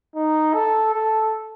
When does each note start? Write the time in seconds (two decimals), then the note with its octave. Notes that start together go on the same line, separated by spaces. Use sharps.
0.15 D#4
0.54 A4
0.94 A4